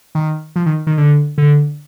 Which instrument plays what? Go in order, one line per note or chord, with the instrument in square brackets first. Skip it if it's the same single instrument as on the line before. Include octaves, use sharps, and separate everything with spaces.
[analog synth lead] D#3
F3
D#3
D#3
D3
D3